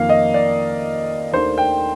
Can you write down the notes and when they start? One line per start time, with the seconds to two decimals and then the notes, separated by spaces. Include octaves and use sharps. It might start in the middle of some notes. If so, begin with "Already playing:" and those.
Already playing: F2 D#3 A#3 F5
0.09 D#5
0.34 D5
1.33 D#2 D#3 A3 D4 C5
1.58 G5